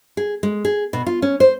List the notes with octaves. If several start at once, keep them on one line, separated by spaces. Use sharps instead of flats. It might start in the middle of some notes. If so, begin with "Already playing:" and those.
G#4
G#3
G#4
B2
F4
C#4
C5